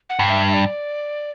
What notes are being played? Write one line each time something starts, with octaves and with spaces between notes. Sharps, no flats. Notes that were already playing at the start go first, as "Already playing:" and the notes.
F#5
G2
E5
E5
D5